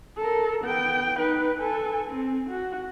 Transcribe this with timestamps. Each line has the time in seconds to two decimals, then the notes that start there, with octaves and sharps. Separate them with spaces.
0.17 A4 A#4
0.64 B3 G5
1.17 D#4 B4
1.59 A4 G#5
2.10 C4
2.49 F#4